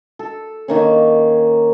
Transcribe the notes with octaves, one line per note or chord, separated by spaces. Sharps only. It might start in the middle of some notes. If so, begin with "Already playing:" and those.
A4
D#3 A#3 C#4